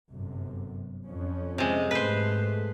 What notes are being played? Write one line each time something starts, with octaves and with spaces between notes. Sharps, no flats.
G1 F#2 C3
F2 F3 C#4
C3 G#3
G#2 A3 B4 C5